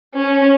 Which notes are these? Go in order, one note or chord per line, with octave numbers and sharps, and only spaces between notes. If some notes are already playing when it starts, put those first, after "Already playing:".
C#4